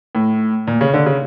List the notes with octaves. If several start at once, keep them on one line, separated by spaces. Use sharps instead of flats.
A2
A#2
C#3
D3
C#3